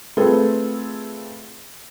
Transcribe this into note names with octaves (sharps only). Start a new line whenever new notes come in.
A3 C4 F4 G#4 A4 B4